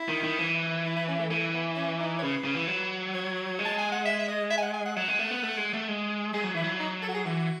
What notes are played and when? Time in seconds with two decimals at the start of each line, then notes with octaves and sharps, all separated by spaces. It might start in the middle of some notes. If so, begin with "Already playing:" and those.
Already playing: E4
0.09 D#3
0.24 D#3
0.39 E3
0.85 E4
0.96 E4
1.08 C#4
1.19 A3
1.30 E3 A3
1.54 B3
1.76 C#4
1.99 D#4
2.18 C#5
2.22 C#3 B4
2.45 C#3
2.56 E3
2.67 F#3
3.14 C#5
3.59 G#3
3.65 A5
3.78 G#5
3.92 F#5
4.05 E5
4.19 E5
4.28 D#5
4.50 E5
4.57 G#5
4.62 F#5
4.74 G#5
4.85 F#5
4.96 F#3 F#5
5.08 G#3
5.19 A3
5.31 B3
5.43 A3
5.57 G#3
5.73 A3
5.88 G#3
6.34 G#3 G#4
6.44 F#3
6.54 E3 E4
6.64 F#3
6.79 D#4
7.02 A4
7.08 F#4
7.14 G#4
7.25 E3 F#4